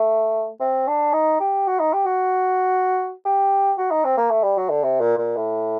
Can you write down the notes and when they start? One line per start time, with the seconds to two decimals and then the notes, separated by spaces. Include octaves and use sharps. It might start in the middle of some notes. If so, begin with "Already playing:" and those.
Already playing: A3
0.60 C4
0.87 D4
1.13 D#4
1.40 G4
1.67 F#4
1.80 D#4
1.93 G4
2.05 F#4
3.25 G4
3.78 F#4
3.91 D#4
4.04 C4
4.17 A#3
4.31 A3
4.43 G3
4.57 F#3
4.70 D3
4.83 C3
5.00 A#2
5.18 A#2
5.36 A2